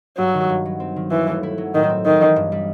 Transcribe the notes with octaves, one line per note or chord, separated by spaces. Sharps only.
G2 F#3
D#3
G2
F#3
C4
D#3
D#2 E3
A3
E4
F#3
A2 D#3
C4
D#3 B3
E3
G2
G3